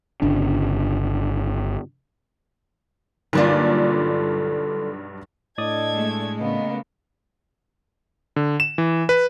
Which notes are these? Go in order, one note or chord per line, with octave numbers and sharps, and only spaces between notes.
G1 C#3 D4
B1 G2 D3 A#3 F4 D5
A2 D4 A4 D5 D#5 D#6 G#6
G#3 A3
C#3 A#3 B3 D#5
D3
E7
E3
B4